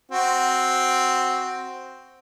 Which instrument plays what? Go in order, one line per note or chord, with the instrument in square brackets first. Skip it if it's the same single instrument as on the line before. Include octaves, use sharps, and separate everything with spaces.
[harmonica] C4 F#4